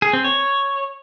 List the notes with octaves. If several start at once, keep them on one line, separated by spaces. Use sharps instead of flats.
G#4
C4
C#5